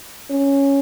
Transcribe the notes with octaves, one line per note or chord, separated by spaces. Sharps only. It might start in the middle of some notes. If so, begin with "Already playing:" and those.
C#4